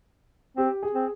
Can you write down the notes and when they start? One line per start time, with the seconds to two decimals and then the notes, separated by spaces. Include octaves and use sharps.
0.57 C4 G4
0.83 G#4
0.95 C4